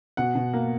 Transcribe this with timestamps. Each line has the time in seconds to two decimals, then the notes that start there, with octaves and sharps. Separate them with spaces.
0.17 B2 F#5
0.35 B2
0.53 A#3